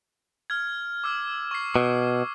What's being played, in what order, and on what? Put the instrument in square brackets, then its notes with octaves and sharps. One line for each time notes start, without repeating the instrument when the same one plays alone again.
[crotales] F6 G#6
D6 E6 F6
C#6 C7
[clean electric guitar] B2